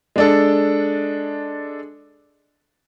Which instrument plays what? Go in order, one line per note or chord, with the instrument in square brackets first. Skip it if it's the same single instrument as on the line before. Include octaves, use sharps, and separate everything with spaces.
[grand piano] G#3 D4 A4